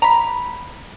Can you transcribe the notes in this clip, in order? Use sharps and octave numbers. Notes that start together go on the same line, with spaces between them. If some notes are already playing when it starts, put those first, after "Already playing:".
A#5 B5